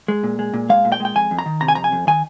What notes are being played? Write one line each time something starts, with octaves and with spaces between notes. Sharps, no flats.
G#3
A#2
G#3
A#2
G#3 F5
A#2
G5
G#3
G5
F2 G#5
F2
A#5
D#3
C3 A#5
G#5
F2 A#5
G#5
F2
D#3 G#5